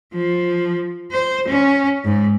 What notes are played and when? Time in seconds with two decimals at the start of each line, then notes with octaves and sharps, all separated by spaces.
0.14 F3
1.12 C5
1.48 C#4
2.05 G#2